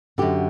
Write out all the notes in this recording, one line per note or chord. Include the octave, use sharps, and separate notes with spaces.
F#2 D3 G4